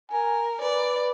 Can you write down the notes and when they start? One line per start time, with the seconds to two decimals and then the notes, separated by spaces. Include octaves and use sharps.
0.11 A#4 G#5
0.62 B4 D5